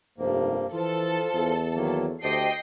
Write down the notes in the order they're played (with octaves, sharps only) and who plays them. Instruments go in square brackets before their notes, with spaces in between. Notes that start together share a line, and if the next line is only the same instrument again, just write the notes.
[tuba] F1 [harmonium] G2 F3 A#3
[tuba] E3 [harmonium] F3 F4 [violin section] A4
[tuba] E2
[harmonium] D#3 F#3 A#3
[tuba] D2 [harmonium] G4 C5 A5 [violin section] D#5 G5 C7